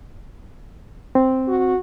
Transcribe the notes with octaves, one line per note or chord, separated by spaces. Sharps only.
C4
F#4